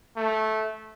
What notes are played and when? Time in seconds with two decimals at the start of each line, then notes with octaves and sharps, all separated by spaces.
0.16 A3